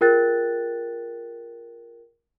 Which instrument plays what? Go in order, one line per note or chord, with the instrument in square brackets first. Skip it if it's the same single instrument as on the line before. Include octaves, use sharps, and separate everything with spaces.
[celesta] F4 G#4 A#4 G5 F#6 A6